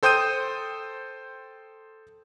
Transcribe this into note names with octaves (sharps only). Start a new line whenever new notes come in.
A4 C5 G5 D#6 G6 D#7